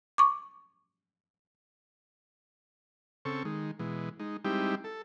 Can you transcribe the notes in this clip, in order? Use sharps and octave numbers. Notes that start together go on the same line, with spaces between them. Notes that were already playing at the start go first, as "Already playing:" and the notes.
C#6 D6
C#3 C4 A4 C#6
D#3 G#3
B2 E3 G#3
G#3 D#4
G3 G#3 C4 D#4 E4 G4
A4